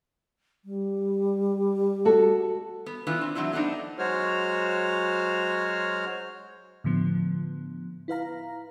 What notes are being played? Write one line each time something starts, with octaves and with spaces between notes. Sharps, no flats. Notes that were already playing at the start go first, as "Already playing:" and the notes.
G3
F#4 A4
B3
E3 B3 D4 F4
C4
E3 F#3 C4 D4 E4
A3 B3 C4 D4 D#4
F#3 G#3 F#4 C5 C#5 F6
A2 D3 F3 B3
E4 B4 F5 A#5